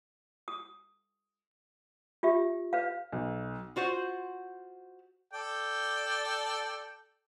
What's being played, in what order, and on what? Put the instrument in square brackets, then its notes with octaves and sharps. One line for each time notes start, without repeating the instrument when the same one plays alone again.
[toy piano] D#6
F4 G4 E5
B4 F5
[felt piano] B1
[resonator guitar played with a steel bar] F4 F#4 C5 F#5
[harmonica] A4 D5 G5